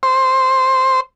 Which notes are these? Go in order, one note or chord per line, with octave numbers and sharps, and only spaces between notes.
C5